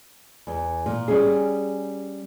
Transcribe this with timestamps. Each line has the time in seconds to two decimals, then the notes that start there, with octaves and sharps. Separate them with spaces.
0.47 E2
0.86 A#2
1.08 G3 C#4 G#4